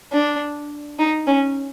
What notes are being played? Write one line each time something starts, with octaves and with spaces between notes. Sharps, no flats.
D4
D#4
C#4